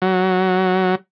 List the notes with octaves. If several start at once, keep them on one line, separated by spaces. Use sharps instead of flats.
F#3